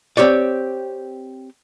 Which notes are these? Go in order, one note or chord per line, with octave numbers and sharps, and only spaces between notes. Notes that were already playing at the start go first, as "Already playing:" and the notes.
C4 G4 C#5 D5